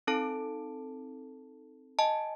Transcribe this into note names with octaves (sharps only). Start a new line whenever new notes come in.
C4 D#4 A4 A5 D7
D#5 G#5 A5